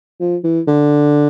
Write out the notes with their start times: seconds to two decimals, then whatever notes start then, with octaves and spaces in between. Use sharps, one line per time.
0.20 F3
0.44 E3
0.68 D3